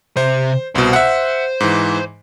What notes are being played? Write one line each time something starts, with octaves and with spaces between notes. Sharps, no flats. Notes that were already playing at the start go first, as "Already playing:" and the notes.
C3 C5 E5
C2 B2 C5
E5 F#5
G#2 E3